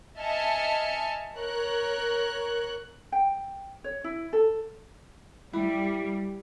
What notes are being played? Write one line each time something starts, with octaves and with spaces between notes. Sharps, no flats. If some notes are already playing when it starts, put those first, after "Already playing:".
D#5 E5 G#5 A5 F6 C#7
A#4 C#5 F#6
G5
C#5
E4
A4
G3 E4